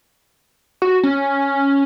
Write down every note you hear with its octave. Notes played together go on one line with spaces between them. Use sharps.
F#4
C#4